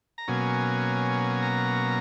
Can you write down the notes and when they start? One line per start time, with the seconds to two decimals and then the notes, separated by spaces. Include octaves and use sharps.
0.18 A#5
0.28 B2 F#3 A#3 C#4 G#5
1.42 A#5